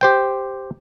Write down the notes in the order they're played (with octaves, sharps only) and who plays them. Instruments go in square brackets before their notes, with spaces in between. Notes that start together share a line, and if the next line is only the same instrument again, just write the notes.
[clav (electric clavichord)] G4 C5 G5